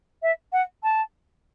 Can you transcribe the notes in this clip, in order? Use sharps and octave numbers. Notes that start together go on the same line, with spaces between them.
E5
F#5
A5